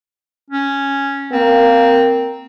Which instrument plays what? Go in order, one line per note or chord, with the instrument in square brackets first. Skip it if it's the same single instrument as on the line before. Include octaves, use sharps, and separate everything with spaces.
[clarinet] C#4
[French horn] A#3 [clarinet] C4